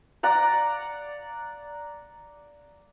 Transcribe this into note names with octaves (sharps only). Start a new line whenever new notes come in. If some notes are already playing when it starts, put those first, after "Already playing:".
D5 F#5 A#5